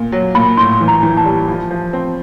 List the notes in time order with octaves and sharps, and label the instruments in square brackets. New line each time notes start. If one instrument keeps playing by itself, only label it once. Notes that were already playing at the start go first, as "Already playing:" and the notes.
Already playing: [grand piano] A#2
F#3
[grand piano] A#2 [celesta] B5
[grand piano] A2 [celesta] C6
[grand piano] E3
[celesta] A#5
[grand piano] E3
[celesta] A5
[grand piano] G3
F3
F3
C4